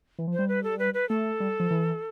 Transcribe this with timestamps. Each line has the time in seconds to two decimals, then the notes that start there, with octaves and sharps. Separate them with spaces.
0.19 E3
0.27 F3
0.33 C5
0.39 G3
0.48 B4
0.63 A4
0.79 B4
0.94 B4
1.09 A3 A4
1.40 G3
1.60 F3
1.71 E3